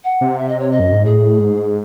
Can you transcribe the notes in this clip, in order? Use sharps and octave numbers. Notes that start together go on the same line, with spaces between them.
F#5
C3
E5
D#5
C#5
D#5
F#2
G#2
A2 G#4
G#2